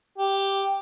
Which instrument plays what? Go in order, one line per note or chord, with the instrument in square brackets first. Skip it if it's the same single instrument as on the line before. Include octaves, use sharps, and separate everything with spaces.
[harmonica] G4